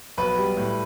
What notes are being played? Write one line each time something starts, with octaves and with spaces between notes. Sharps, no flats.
B1 B4
G3
A2